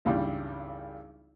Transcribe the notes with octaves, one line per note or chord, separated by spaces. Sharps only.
G#1 C#2 G2 E3 G3